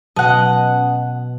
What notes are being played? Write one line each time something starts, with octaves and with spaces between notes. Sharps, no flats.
B2 F#3 C#4 D#5 F#5 A5 D7